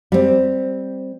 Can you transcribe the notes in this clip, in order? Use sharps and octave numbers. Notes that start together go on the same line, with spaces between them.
G3 C4